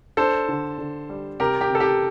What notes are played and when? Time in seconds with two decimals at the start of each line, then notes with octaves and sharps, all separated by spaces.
0.17 D4 A4 C5
0.48 D3
0.78 D3
1.09 G3
1.39 C3 G4 A#4
1.61 G4
1.70 C3 A4
1.80 G4